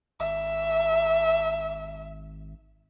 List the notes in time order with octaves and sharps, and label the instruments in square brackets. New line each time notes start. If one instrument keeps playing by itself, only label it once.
[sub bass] G#1 [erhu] E5